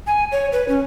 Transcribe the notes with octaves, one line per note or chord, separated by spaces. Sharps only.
G#5
C#5
B4
C#4